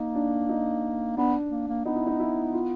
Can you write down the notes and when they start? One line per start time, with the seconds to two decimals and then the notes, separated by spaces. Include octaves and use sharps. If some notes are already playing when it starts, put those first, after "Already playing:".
Already playing: A#3 D#4
0.15 D4
0.49 D#4
1.17 B3 D4
1.51 A#3
1.68 A#3
1.85 B3 D#4
1.96 E4
2.07 D#4
2.20 E4
2.53 F4